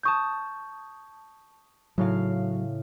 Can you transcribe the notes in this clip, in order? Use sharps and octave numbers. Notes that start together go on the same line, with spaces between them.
A5 C#6 D#6 G6 G#6
A2 C#3 F#3 F5